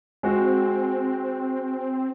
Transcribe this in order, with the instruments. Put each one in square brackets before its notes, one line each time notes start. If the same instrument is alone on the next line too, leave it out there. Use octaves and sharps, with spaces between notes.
[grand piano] G#3 F#4 [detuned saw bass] C4